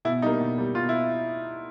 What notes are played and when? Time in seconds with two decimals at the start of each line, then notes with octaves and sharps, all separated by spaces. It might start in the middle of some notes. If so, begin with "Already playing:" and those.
0.05 B2 E4
0.22 G3 A#3 D#4
0.41 B2
0.58 G3 A#3
0.75 B2 F4
0.89 E4